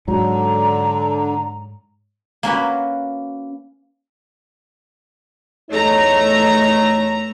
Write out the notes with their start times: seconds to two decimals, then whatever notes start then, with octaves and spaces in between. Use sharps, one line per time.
0.08 G#2 D3 F#3 A#5
2.43 A#3 C#4 F#4 B4
5.70 E2 A3 D#4 C#5 A#5